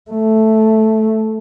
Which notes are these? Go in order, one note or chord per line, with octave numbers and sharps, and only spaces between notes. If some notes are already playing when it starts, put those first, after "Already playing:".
A3